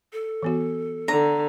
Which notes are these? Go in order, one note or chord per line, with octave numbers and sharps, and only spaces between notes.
A4
E3 B3 F#4
D3 A#5